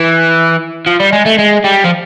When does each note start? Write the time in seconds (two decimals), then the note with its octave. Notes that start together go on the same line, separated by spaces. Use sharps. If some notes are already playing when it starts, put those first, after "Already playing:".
Already playing: E3
0.86 F3
1.00 G3
1.12 G#3
1.26 A3
1.38 G#3
1.64 G3
1.84 F3